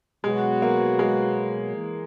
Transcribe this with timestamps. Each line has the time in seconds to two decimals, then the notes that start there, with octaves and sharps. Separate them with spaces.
0.24 B2 F#3 G#3 B3 F#4 B4
0.62 A#3
0.99 G#3
1.75 E3 A#3